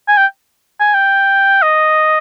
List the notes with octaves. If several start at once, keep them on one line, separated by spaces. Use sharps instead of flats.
G#5
G5
G#5
G5
D#5